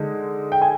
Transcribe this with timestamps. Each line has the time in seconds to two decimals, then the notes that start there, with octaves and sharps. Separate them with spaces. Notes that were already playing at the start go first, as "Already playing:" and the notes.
Already playing: D3 G#3 D#4
0.52 G5
0.62 G#5